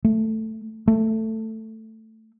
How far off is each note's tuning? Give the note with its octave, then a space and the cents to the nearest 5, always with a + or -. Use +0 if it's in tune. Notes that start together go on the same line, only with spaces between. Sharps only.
A3 +5
A3 +10